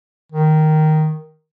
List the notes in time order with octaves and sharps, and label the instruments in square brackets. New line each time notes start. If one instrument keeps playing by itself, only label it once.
[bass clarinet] D#3